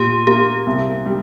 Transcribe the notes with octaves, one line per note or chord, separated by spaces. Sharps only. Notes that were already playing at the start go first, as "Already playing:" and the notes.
Already playing: A#2 G4
A#3 G4
C2
G3